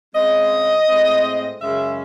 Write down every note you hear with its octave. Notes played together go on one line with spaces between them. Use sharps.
C#3 G#3 C4 D#5
A2 G#3 C4
F#2 C#3 G#3 C#4 E5